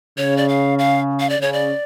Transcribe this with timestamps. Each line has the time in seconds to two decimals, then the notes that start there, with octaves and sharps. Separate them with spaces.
0.17 C#3 C#5
0.37 D5
0.49 F5
0.79 F5
1.20 F5
1.30 D5
1.39 C#3 C#5
1.53 D5